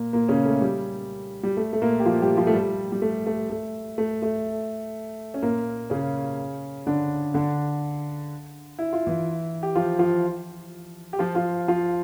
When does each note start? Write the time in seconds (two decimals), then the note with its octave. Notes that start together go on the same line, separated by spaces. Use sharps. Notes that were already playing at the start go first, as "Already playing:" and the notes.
Already playing: A#2 A#3
0.13 A#2 A#3
0.29 C#3 C#4
0.45 A3
0.61 G3
1.43 G3
1.57 A3
1.73 A3
1.81 A#2 A#3
2.00 G4
2.06 F3 F4
2.22 G3 G4
2.37 F3 F4
2.47 A3
2.54 G3
2.92 G3
3.02 A3
3.26 A3
3.50 A3
3.98 A3
4.22 A3
5.34 C#4
5.42 A#2 A#3
5.90 C#3 C#4
6.87 D3 D4
7.34 D3 D4
8.79 E4
8.93 F4
9.07 E3 E4
9.63 G4
9.76 F3 F4
9.99 F3 F4
11.13 G4
11.19 F3 F4
11.35 F3 F4
11.68 F3 F4